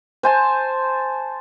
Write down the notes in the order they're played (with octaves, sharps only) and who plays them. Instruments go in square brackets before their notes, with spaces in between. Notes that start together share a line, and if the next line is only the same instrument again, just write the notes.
[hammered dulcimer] C5 G#5 A5